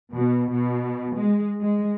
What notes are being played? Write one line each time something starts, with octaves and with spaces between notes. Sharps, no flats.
B2
B2
G#3
G#3